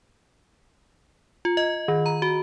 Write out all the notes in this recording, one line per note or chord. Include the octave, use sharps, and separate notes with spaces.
F4
D#5
D#3
A#5
F#4